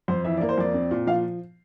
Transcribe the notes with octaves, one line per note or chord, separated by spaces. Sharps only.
F2 C5
E3 E5
A#3 D5
C5
F2 D5
C4
A#2
F3 F5